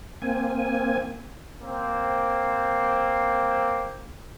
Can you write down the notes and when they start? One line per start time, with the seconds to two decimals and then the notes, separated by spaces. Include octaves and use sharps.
0.22 A#3 C4 G#5
1.61 A#3 C4